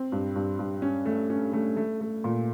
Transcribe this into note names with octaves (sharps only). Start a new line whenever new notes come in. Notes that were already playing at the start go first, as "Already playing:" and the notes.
Already playing: C4
G2
G2
G2
C#4
A3
C#4
A3
A3
A3
A#2